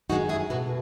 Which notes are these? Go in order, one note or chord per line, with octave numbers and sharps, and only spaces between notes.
F#2 D#3 G#3 D#4 F#4
E4 G#4
B2 A3 F#4 A4